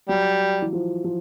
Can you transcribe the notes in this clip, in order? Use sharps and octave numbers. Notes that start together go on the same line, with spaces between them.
F#3 G3
E3
F3
F3